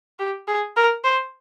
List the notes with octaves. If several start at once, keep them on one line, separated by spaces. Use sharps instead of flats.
G4
G#4
A#4
C5